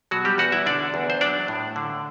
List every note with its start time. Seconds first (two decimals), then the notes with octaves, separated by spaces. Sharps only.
0.11 B2 F#3 F#4
0.25 G3 G4
0.38 E2 F#4 F#5
0.52 E4 E5
0.66 D3 D4 D5
0.94 E2
1.10 C5
1.21 F#3 D4 D5
1.48 A2
1.76 D3